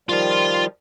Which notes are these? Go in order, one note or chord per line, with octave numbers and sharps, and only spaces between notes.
D#3 F3 G3 F4 C6